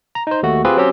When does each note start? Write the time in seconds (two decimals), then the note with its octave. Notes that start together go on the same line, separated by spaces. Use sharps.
0.15 A#5
0.27 D#4 C5
0.43 D#2 A3 F#4
0.65 C4 F4 G4 G#4 B4
0.77 F#3 C4 C#4 G4